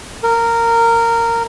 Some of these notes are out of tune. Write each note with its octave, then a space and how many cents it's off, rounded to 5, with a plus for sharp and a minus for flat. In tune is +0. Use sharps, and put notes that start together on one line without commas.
A#4 -15